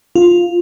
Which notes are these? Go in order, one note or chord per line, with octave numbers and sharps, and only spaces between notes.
F4